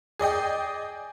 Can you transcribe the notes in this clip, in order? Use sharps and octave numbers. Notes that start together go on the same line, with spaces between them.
G#4 D5 D#5 G5